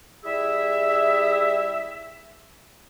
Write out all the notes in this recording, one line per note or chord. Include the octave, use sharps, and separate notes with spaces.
G3 E4 G#4 E5